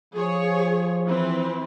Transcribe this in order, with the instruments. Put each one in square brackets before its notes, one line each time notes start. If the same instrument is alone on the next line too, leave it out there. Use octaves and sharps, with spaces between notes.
[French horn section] F3 [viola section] G#4 C#5
[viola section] E3 C4 B4